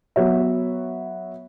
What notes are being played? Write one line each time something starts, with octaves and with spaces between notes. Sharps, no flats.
F#3 B3 F#4 C#5 E5